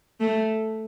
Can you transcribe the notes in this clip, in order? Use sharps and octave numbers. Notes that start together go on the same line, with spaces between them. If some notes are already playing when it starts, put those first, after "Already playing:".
A3